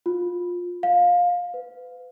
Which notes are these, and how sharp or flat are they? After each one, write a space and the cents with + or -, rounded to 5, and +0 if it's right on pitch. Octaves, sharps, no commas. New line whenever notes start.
F4 +20
F5 +20
B4 +35